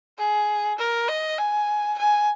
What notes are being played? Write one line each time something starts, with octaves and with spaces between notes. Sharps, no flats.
G#4
A#4
D#5
G#5
G#5